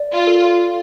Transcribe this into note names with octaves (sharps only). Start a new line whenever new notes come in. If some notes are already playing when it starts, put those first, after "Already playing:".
Already playing: D5
F4
A4